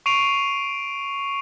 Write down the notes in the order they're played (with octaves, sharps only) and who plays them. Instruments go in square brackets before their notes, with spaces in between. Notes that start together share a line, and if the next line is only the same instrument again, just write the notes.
[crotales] C#6 C7 D7 D#7 F7